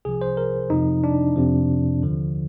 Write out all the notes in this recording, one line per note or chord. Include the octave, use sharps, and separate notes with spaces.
C2 C3 F3 G#4
C5
A#4
F2 C3 F3 D#4
D4
F2 C3 F3
D#2 D3 F3